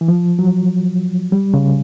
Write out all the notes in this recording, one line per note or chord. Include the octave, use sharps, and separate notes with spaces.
E3
F3
F#3
G3
C#3